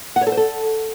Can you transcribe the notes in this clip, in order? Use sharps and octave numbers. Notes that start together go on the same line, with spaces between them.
F#5
C#5
A4
C5
A4